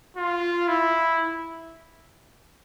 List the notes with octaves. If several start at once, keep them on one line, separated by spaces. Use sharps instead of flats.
F4
E4